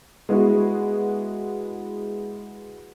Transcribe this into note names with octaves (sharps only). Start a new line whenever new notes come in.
G#3 B3 E4 F#4